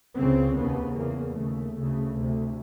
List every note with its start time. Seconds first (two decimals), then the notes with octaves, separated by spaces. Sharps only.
0.17 C#2 C#3 C4
0.57 D#2 C#3 B3
0.96 E2 C#3 A#3
1.36 D#2 C#3 A3
1.76 D2 C#3
2.15 D2 C3